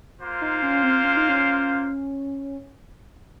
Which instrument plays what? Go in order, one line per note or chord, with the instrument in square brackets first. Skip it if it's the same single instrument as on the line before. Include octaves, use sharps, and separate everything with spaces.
[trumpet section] A#3 F4 C5 F5
[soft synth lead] D#4
C#4
C4
C#4
D#4
C#4